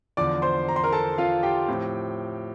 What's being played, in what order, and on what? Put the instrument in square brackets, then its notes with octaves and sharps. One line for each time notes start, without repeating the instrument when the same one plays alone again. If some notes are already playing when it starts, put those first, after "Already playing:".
[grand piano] E2 D3 F3 D5 D6
C5 C6
A#5
C6
A#4 A#5
A4 A5
F4 F5
G4 G5
A2 F3 C4